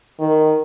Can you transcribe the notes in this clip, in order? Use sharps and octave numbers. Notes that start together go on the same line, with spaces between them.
D#3